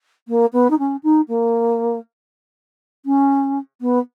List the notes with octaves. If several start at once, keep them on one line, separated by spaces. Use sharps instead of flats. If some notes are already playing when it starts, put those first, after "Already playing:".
A#3
B3
D#4
C#4
D#4
A#3
C#4
B3